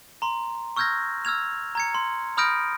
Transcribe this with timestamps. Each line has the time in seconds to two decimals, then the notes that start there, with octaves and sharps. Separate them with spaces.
0.22 A#5 C6
0.77 C#6 E6 F6 G6 G#6 A#6
1.25 E6 F6 G#6 F7
1.75 A#5 G#6 C#7
1.95 C6
2.37 B5 D#6 F6 G6 A#6 D7